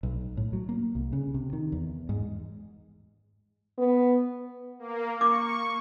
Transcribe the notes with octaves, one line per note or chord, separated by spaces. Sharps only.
B1
A2
F#3
A#3
C2
C#3
C3
D#3
E2
G#2
B3
A#3
C#6 D6